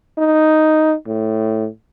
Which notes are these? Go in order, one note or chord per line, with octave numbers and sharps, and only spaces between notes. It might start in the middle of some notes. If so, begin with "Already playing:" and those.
D#4
A2